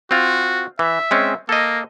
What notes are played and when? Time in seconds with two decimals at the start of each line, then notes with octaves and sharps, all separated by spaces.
0.11 C4 F4 F#4
0.79 E3 E5
1.11 G#3 C4 C#4
1.49 A#3 A4 D#5